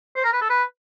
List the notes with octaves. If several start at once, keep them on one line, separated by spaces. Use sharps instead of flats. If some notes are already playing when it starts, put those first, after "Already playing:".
C5
A#4
B4
A4
B4